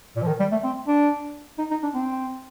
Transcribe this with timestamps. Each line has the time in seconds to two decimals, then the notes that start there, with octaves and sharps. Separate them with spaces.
0.16 A#2
0.22 F3
0.27 D#3
0.39 G3
0.51 A3
0.63 C4
0.87 D4
1.58 D#4
1.71 D#4
1.83 D4
1.94 C4